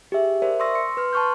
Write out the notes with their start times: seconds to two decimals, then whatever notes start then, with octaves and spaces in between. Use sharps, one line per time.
0.12 G4 G#4 E5
0.42 A#4 C5 D5 E5
0.60 C6 C#6 D#6 E6 A#6
0.74 C6 C#7
0.97 B4 C6 F6
1.13 A5 C6 C#6 F6 G6